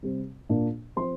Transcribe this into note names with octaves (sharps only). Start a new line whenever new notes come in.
C3 G3 C4
A#2 A#3 D4
F3 C4 C6